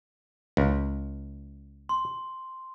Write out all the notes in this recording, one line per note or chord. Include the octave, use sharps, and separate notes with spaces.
C#2
C6